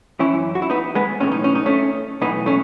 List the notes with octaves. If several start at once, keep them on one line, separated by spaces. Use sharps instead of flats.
F#2 E3 C#4 E4
F#4
E4
B3 D#4
G#3 B3
B1 A2 E3 C#4
D#4
C#4
D#4
A3 C#4
B1 A2 E3 B3 D#4
A3 C#4